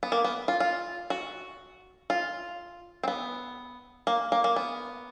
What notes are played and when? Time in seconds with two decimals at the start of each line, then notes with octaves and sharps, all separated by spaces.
0.03 B3
0.12 A#3
0.24 B3
0.48 F4
0.60 F4
1.10 F#4
2.10 F4
3.03 C4
3.08 B3
4.07 A#3
4.32 A#3
4.44 A#3
4.56 B3